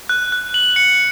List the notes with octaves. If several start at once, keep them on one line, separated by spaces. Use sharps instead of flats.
F#6
F#6
F#7
C#7